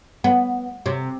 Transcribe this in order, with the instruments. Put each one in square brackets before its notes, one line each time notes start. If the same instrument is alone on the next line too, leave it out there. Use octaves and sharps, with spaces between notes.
[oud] B3
C3